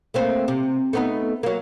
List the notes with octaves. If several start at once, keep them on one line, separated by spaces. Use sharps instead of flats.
A3 A#3 C4
C3
A3 B3 D#4
F#3 A#3